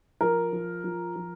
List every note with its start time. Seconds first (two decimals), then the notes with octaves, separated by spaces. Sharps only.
0.21 F3 A#4
0.53 F3
0.84 F3
1.15 F3